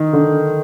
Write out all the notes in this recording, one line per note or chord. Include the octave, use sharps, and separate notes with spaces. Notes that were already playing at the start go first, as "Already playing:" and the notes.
Already playing: D#3
D3